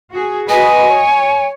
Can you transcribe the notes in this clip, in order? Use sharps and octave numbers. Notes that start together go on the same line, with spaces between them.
F#4 G#4
F#4 B4 D#5 G#5
C#5